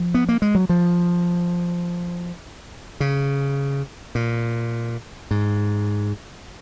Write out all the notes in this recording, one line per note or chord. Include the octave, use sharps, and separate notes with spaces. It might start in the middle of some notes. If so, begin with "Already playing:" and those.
Already playing: F3
B3
A#3
G#3
F#3
F3
C#3
A#2
G#2